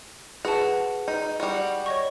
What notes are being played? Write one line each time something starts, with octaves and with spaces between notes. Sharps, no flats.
F#4 G#4 B4 A5
D#4
G3 F#4
C#5 D#5 C#6